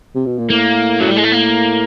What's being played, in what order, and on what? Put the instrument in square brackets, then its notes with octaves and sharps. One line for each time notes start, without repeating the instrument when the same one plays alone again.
[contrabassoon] C3
B2
A#2
[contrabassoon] A2 [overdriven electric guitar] A#3
[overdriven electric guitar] F#3
G3
G#3
A3
A#3